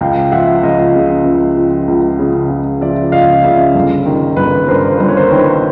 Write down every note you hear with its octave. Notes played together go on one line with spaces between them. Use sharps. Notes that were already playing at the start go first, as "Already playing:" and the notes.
C#2 F5 G5
F3 E5 F#5
C#2 D#5 F5
C#3
C#2
F3
C#2
C#3
C#2
F3 D5 E5
C#2 D#5 F5
C#3 D5 E5
G1
D#3
G1 B4
G2 A#4 C5
G1 C5
C#5
A#4 C5
D#3 B4 C#5